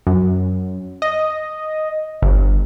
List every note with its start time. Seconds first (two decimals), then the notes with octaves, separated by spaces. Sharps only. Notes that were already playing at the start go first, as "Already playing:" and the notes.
0.07 F#2
1.02 D#5
2.22 G1